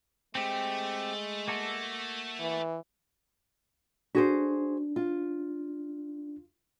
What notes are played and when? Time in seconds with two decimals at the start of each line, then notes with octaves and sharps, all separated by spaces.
0.35 G#3 A3 C4 G4
1.48 A#3 F#4 A4
2.40 E3
4.15 D4 F#4 G#4 C5
4.96 F4